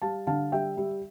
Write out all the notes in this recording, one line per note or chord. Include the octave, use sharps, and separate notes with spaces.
G3 F5 A5
D3 F5 A5
G3 E5 G5
G3